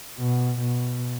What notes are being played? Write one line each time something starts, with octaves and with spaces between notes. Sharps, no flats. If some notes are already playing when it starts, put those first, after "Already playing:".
B2
B2